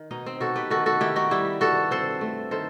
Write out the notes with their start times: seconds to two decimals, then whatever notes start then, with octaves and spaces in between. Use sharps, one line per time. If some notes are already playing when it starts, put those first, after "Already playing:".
Already playing: D#3
0.11 B2 D#4
0.26 C4
0.40 B2 F#4 A4
0.56 G4 B4
0.70 D#3 F#4 A4
0.86 F#4 A4
1.01 D#3 E4 G4
1.16 D#4 F#4
1.31 G3 E4 G4
1.61 G2 F#4 A4
1.91 C4 A4 C5
2.21 A3
2.51 D#3 A4 C5